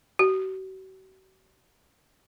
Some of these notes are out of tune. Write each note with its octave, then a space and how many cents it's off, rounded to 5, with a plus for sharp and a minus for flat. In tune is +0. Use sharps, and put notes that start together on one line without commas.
F#4 +40